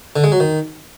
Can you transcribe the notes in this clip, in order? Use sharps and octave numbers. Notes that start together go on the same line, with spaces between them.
D3
G#3
F#3
D#3